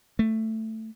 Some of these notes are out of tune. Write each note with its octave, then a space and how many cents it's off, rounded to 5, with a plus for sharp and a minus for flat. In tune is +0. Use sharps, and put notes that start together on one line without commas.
A3 +10